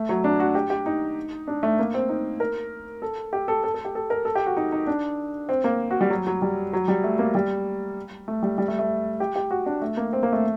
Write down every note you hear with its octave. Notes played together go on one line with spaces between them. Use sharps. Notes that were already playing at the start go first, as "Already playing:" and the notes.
Already playing: A3
F#3
D4
F#4
G4
G4
D#4
D4
A3
A#3
C4
D#4
A#4
A4
G4
A4
A4
A4
G4
A4
A#4
A4
G4
F#4
D#4
D#4
D4
C4
A#3
F#4
G3
F#3
F#3
G3
F#3
G3
A3
A#3
G3
A3
G3
G3
A3
A3
G4
G4
F#4
D4
A3
A#3
C4
A#3
A3